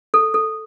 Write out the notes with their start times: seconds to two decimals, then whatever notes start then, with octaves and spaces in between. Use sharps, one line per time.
0.14 A4
0.34 A4